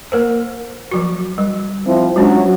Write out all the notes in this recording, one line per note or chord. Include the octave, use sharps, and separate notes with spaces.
A#3 A#4 C5
F3 F#3 F#4
G3
F3 C4 E4
F#3 G#3 C#4 D4